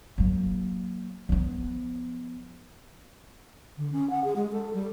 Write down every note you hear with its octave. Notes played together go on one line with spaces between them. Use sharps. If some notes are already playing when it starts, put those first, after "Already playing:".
F#3 A#3
F3 B3
D3
C#4
F#5
G#4
G#3
A4
G3